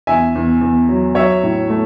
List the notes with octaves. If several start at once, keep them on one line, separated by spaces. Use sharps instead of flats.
E2 E5 G#5
E2
E2
F#3
F#3 C#5 E5
A2
A3